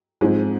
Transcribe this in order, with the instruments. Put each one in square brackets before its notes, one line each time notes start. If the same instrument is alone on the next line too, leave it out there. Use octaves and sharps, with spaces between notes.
[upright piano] G#2 F3 G#3 C4